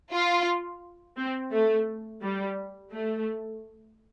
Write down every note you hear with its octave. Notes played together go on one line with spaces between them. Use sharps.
F4
C4
A3
G3
A3